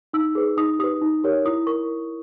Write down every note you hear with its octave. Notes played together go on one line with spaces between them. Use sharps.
D#4 E6
G#4 B4
D#4 D#6
G4 B4 D#6
D#4
G4 A#4 C#5
E4 D#6
A#4 C#6